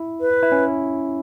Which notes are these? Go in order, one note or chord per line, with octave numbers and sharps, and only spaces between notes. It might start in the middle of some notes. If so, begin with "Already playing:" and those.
Already playing: E4
B4
E4
C#4